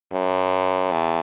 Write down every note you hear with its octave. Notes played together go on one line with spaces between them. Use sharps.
F#2
E2